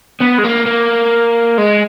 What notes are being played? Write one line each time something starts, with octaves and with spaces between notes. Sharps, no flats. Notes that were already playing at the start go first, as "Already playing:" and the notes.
B3
G#3
A#3
A#3
G#3